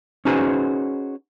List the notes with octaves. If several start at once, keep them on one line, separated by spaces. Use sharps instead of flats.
C#4 D#4 F#4 G#4 B4 C5